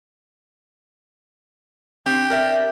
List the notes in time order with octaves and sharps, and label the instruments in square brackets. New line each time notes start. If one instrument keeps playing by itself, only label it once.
[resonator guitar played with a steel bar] C4 [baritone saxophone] G4
[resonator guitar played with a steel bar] A#4 D5 E5